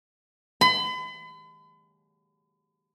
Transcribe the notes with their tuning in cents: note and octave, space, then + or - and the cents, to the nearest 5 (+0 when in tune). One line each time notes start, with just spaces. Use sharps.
B5 +40